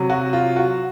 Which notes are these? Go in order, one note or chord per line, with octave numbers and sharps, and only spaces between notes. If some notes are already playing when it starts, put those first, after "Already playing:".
Already playing: C3 F#3
F#4
F4
F#4